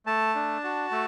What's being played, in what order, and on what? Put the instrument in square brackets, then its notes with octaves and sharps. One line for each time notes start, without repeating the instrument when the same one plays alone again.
[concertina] A3 A5
D4
F#4
A3